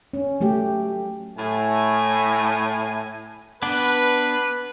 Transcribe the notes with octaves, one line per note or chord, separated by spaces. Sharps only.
C#4
F#3 A3 G4
A2 G#5
B3 D4 B4